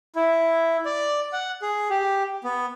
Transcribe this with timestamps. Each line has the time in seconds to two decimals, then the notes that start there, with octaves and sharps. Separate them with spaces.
0.16 E4
0.85 D5
1.33 F#5
1.62 G#4
1.90 G4
2.44 B3